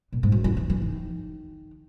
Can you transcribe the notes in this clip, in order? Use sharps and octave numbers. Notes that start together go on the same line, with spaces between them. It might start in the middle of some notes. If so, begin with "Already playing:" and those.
A#2
G#2
F#2
E3
E3
E3
D#3